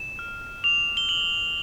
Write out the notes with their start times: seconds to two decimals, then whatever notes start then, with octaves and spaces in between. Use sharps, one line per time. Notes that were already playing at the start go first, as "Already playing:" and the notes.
Already playing: E7
0.19 F6
0.64 D6 F7
0.97 G7
1.09 F6 F#7